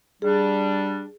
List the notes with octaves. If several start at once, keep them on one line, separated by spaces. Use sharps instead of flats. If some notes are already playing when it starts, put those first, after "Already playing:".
G3 D4 G#4